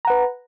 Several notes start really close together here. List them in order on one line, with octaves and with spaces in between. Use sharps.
A#5 F#5 B4